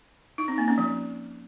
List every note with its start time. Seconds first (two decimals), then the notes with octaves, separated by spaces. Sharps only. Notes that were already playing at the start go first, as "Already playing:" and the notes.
0.38 D#4
0.48 C4
0.58 A#3
0.68 C#4
0.78 F3